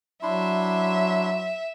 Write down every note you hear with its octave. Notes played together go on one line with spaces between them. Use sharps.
F#3 D4 E4 E5 C6